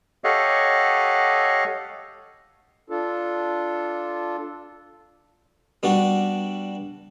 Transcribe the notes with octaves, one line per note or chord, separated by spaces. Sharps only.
G4 A4 C#5 D#5 F5 F#5
D4 F4 A4
G3 B3 D4 F#4